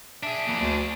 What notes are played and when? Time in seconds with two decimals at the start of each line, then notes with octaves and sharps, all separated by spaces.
0.23 D4 G#4 E5
0.48 F2 E3 A#3
0.61 D2 A3 D5